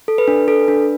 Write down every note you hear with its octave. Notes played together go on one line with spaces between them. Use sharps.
A4
B4
D4
A4
D4